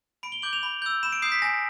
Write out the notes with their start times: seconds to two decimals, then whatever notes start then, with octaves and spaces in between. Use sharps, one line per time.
0.23 B5 D7
0.32 G7
0.42 D6 G6 F#7
0.53 F7
0.63 B5
0.82 E6 G6
1.03 B5 E7
1.12 D7
1.22 D#6 G6 C7
1.32 B6
1.42 G#5 A#6